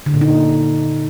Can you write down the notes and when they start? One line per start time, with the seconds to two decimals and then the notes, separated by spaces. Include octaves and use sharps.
0.06 D3
0.14 A#2
0.21 D#4